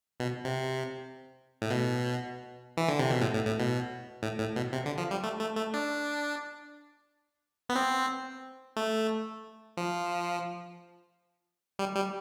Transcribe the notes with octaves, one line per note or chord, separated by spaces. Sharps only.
B2
C3
A2
B2
E3
D3
C3
B2
A2
A2
A2
B2
A2
A2
B2
C3
D3
F3
G3
A3
A3
A3
D4
B3
C4
A3
F3
G3
G3